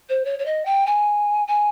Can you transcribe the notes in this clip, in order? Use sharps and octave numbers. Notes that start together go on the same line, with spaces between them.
C5
C#5
C#5
D#5
G5
G#5
G#5